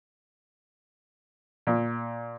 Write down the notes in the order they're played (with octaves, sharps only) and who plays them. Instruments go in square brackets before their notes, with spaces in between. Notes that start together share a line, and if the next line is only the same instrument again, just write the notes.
[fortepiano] A#2